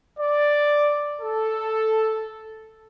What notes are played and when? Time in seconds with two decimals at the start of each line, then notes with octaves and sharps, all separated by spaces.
0.18 D5
1.22 A4